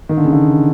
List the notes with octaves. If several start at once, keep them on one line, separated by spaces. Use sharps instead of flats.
D#3
D3
C#3
D3